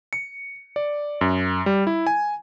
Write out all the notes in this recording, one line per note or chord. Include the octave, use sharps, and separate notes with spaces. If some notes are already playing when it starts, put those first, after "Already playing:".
C#7
D5
F#2
G3
E4
G#5